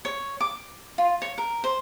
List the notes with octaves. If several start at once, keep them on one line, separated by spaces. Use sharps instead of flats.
C#5
D6
F4
C#5
A#4
C5